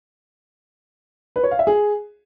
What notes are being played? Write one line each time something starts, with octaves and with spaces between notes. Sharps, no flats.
B4
C#5
F5
E5
G#4